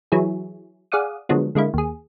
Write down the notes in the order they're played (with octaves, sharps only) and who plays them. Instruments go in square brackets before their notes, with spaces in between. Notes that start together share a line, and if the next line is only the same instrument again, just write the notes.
[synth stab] E3 F#3 E4 G#4
G#4 D5 F5 F#5 D#6
D3 F3 F#3 G#3 B3
D3 G#3 A#3 E4
D#2 G#4